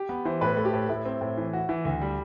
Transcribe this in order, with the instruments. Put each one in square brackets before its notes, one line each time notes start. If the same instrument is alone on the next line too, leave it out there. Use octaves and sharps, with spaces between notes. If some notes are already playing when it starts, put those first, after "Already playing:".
Already playing: [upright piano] G4
[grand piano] B3
[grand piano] E3 [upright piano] C5
[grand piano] A2 [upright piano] B4
[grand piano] A3
[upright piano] G4
[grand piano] A2
[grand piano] A2 [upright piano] E4
[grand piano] C4
A2
E3
F#4
E3
D2
G3